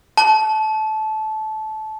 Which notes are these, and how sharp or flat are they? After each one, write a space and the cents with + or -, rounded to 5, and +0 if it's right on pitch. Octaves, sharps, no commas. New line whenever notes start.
A5 -20